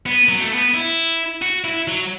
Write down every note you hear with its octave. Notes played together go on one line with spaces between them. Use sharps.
B3
F#3
A3
B3
E4
F#4
E4
F#3